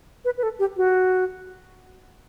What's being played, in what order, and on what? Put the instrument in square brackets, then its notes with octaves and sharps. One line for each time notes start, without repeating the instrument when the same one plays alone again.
[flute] B4
B4
A4
G4
F#4